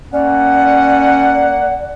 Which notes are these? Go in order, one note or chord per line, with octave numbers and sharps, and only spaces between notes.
A#3 C#4 D5 F#5